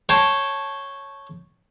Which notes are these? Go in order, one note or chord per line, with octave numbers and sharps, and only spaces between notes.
C#5 G5 A5 C6